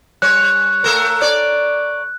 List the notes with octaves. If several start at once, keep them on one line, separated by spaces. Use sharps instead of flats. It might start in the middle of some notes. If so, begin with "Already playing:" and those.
G3 C#5 F#6
A3 A4 A#4
C#5 D5